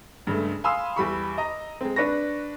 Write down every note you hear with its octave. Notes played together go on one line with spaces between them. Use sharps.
G2 C#3 G#3 A3
F5 G#5 B5 C6 D#6 E6
E2 G3 B5 C#6
D#5 A#5
G#3 C4
D4 B4 C#6 A#6